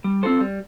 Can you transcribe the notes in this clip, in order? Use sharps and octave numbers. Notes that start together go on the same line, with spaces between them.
G3
C4 F4 A4 C5
G3